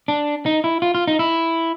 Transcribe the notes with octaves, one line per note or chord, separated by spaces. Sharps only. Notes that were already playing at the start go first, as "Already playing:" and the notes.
D4
D#4
E4
F4
F4
D#4
E4